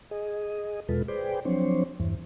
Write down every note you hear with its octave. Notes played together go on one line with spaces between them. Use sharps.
G#4 D#5
E2 B2 G#3 F4 A4 B4
G#4 B4 C5 D5 G5
F3 F#3 C4 D4 C5 C#5
E2 G2 E3